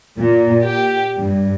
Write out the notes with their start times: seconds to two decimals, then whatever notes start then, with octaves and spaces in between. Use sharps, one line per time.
0.18 A#2
0.64 G4
1.17 G2